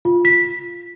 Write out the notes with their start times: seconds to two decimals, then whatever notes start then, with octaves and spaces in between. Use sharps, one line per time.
0.05 F4
0.25 B6